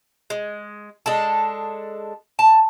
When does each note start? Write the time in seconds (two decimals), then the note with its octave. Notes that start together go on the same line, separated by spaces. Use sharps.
0.30 G#3
1.06 G#3 D4 A4
2.39 A5